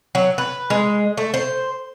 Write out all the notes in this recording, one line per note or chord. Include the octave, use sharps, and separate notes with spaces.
F#3
B4
G#3
A3
C5